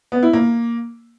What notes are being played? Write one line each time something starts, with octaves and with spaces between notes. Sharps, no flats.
B3
E4
A#3